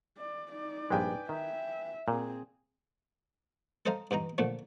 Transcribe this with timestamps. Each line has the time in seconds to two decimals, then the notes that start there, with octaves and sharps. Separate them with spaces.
0.18 D5
0.51 D#4 D5
0.90 A#1 G2 G#3 B4 G5 G#5
1.29 D#3 E5
2.08 A#2 C4 G#4
3.86 A4 C5 D#5 F5 A#5
4.11 G2 E3 D#4 A#5
4.38 A#2 D3 F3 A3